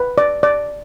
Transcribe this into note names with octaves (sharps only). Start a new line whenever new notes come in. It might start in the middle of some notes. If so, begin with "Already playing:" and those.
Already playing: B4
D5
D5